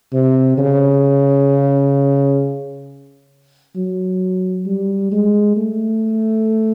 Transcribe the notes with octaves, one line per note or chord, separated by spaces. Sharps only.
C3
C#3
F#3
G3
G#3
A3